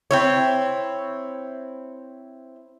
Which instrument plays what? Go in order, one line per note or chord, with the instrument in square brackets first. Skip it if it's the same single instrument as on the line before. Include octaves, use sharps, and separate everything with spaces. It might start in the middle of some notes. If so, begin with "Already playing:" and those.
[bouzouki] C4 E4 C#5